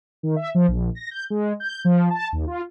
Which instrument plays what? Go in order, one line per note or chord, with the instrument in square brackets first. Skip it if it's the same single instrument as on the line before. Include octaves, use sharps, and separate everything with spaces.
[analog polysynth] D#3
E5
F3
A#1
A#6
G6
G#3
G6
F3
A5
D#2
F4